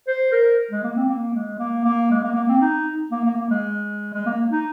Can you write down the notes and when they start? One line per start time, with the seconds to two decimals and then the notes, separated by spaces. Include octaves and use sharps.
0.07 C5
0.32 A#4
0.71 G#3
0.83 A#3
0.96 C4
1.08 A#3
1.35 G#3
1.59 A#3
1.84 A#3
2.11 G#3
2.23 A#3
2.36 A#3
2.48 C4
2.61 D#4
3.11 A#3
3.25 A#3
3.37 A#3
3.50 G#3
4.14 G#3
4.26 A#3
4.51 D#4